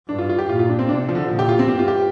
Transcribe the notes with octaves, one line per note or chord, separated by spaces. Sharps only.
G2 D4
F4
F4
G4
A#2 F4
F4
D4
C4
C3 D4
F3
D3
A#2 F3
G4
F4
C4
G2 G4
F4
G4